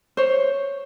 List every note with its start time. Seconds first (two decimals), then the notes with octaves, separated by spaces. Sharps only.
0.17 C5 C#5